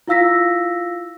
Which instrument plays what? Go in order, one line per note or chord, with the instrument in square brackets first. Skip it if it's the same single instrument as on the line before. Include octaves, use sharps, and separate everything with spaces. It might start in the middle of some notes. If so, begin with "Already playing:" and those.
[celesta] E4 F4 F5 E6 A#6 B6